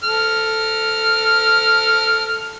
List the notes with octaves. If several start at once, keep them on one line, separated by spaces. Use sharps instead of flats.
A4 F6